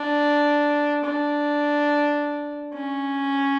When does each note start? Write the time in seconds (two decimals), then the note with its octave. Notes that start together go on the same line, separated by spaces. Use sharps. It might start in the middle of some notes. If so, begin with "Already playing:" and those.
Already playing: D4
1.04 D4
2.74 C#4